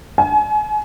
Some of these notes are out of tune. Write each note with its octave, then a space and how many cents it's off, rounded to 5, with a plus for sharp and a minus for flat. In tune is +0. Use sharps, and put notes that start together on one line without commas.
G#5 +35